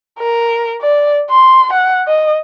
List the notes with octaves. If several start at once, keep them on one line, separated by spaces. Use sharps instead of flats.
A#4
D5
C6
F#5
D#5